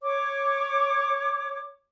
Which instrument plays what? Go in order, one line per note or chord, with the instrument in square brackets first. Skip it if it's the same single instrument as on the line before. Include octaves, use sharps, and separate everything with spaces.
[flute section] C#5 D6